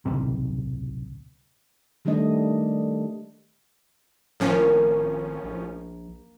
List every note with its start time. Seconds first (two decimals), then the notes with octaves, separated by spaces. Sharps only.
0.06 D1 B1 C3
2.05 D#3 G3 A3 D4 D#5
4.40 G#1 A2 F3 A#3 C#4
5.44 A#1